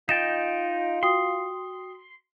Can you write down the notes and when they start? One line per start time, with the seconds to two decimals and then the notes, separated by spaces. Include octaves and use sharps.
0.09 D#4 F4 D#5 G5 A6 E7
1.03 F#4 G5 C6 D#6